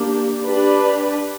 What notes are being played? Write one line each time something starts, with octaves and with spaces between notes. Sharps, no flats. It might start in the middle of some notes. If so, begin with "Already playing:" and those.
Already playing: A#3 D4 G4
D4 G4 B4 D5